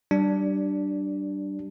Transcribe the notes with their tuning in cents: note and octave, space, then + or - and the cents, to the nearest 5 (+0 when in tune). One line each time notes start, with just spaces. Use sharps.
G3 -20 D4 +0